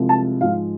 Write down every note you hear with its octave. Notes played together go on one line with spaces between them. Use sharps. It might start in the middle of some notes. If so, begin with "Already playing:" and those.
Already playing: C2 C3 F3 G#3
A5
G#2 F3 G#3 F5